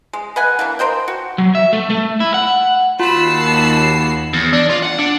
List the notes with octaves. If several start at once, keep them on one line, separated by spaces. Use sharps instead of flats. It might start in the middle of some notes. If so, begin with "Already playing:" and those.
G#3
B4 D#5 F#5 G#5
E3 A#3 D4
A#4 C5 D#5 G5
F#4
F#3
E5
A3
A3
E4
F#5
D#2 F4 F#4 A5 B5 E6 C7
E2
D4
F4
F#5
D4